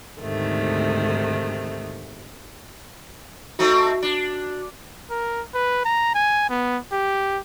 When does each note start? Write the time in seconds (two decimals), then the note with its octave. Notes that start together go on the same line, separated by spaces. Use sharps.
0.21 D2 G#2 C3 D#3 A3
3.59 A3 C4 D#4 F#4
4.03 D4
5.10 A#4
5.54 B4
5.85 A#5
6.15 G#5
6.50 B3
6.92 G4